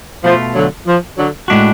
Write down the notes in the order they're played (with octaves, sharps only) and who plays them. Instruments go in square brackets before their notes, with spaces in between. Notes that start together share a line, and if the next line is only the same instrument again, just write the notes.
[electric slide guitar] B2 A3 F4 [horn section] F3
[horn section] D3 F#3
F3
D3 F#3
[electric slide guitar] A2 G#3 D4 F#4